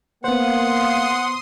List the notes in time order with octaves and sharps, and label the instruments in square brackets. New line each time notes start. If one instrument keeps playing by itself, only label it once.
[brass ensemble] A#3 F5 [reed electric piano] B3 C5 [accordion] F#5 [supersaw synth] C6 D#6